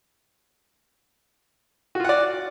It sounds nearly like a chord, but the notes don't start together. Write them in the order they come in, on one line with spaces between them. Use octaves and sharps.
F#4 F4 F#5 D5